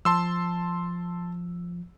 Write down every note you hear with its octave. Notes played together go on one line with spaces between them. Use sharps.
F3 A5 C6 E6